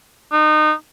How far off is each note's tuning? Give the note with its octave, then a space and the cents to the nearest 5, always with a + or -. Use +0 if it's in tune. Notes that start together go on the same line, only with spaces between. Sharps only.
D#4 -25